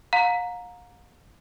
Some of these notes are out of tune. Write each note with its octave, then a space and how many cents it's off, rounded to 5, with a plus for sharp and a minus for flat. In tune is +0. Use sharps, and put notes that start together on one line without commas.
F5 +40 A#5 +0